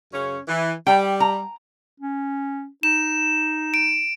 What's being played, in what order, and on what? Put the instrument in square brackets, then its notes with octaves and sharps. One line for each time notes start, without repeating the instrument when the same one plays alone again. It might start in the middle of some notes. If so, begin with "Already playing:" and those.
[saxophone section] F#2 C#3 C#4
E3
[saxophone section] G3 [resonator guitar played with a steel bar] G5
[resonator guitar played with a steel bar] A#5
[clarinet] C#4
[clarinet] D#4 [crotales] E7
[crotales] D7